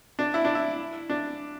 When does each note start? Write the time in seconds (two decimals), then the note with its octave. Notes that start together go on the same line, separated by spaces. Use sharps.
0.19 D4
0.34 E4
0.45 D4
0.55 E4
1.09 D4